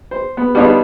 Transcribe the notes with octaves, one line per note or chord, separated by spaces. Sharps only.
C5
B3
G3 B3 D4 D#4 F4 C#5